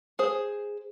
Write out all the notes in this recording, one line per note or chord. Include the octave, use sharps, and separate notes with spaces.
G#4 C5